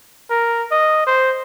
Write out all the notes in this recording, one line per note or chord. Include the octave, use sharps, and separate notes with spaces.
A#4
D#5
C5